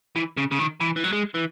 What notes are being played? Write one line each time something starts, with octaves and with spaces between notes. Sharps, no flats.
E3
C#3
C#3
D#3
E3
E3
F#3
G#3
E3